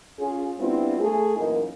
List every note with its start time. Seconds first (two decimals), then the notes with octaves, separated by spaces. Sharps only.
0.19 C#4 F4 G#4
0.59 G3 B3 C4 D4 E4 F4
1.00 A3 G#4
1.37 F#2 A#2 E3 A#3 D#4